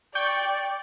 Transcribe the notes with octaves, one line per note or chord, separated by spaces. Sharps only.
D5 G5 C#6 G6